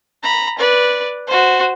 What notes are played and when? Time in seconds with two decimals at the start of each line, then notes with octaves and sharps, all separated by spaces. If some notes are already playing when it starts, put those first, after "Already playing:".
0.23 A#5 B5
0.59 B4 D5
1.27 F#4 C5